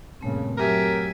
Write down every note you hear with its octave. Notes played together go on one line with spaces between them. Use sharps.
G2 A#2 C#3 A3 C4
F#3 G4 A#4 E5 G#5